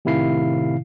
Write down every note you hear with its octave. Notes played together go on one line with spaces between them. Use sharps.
A2 C3 D#3 E4 F5 C7